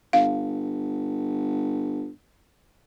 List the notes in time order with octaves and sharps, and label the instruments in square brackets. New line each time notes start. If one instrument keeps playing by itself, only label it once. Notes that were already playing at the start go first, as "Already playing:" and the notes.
[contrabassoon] G1 [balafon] F5